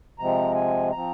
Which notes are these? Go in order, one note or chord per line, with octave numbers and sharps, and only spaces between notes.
C3 F3 G#3 C4 A#5
G#5
F3 C4 A#5